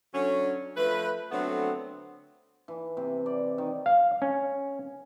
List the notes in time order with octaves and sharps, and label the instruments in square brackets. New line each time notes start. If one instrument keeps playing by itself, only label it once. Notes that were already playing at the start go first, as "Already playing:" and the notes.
[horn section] D3 F#3 C#4
F3 A3 B4
D3 F#3 A3 B3 C4
[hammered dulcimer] E3
C3
D5
D#3
[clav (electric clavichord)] F5
C#4